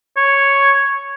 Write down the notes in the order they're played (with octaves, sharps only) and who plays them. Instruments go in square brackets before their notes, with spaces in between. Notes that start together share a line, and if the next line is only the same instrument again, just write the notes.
[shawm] C#5